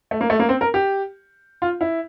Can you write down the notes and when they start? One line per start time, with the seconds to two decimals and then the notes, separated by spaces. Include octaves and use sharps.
0.11 A3
0.21 A#3
0.30 A3
0.40 A#3
0.49 C4
0.61 A#4
0.74 G4
1.62 F4
1.81 E4